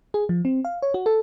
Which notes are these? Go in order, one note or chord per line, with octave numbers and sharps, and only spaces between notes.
G#4
F3
C4
F5
C#5
F#4
A4